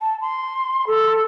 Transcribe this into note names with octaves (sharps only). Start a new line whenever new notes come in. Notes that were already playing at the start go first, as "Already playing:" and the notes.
A5
C6
A4